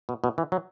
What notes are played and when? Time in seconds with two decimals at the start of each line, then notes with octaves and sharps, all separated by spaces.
0.09 B2
0.24 B2
0.38 E3
0.52 F#3